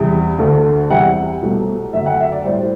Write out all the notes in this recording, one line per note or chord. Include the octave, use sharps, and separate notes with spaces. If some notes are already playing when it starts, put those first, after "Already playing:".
Already playing: E2 C3 G3
D2 D3 A3
E2 C3 G3 F#5
C2 B2 F#3 A3
F#2 D3 F#3 A3 E5
F#5
E5
D5
A2 G3 C5